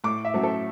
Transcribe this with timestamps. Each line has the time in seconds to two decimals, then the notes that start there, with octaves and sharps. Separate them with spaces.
0.04 A2 D6
0.25 E5
0.34 F#3 A3 C#4
0.43 A4